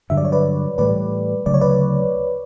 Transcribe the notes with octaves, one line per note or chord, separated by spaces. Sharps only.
G2 D3 F#3 E5
D5
C#5
B4 D5
A2 E3 G3 B4 D5
D2 C#3 F#3 D5
C#5
B4 D5